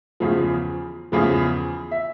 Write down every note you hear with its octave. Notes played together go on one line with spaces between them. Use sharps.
E2 C#3 F3
E2 C#3 F3
E5